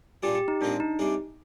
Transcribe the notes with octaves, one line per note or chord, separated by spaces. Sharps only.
A#2 G3 D4 F4 G4 G#4
G4
D#4
A#2 G#3 C4 D4 F4 G#4
D#4
C3 G3 D4 G#4